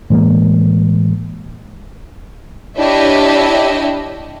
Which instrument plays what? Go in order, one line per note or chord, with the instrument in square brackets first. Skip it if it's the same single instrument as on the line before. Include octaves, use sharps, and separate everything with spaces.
[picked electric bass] A2 E3 G#3 A#3
[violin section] D4 E4 G4 C#5 D#5 E5